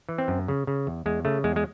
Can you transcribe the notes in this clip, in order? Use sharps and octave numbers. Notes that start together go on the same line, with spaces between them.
E3
C4
F#2
C#3
C#3
E2
E2 G#3
C#3 A3
E2 G#3
G#3